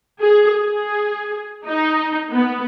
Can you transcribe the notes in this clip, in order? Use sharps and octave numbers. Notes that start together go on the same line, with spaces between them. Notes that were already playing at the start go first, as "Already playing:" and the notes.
G#4
G#4
D#4
B3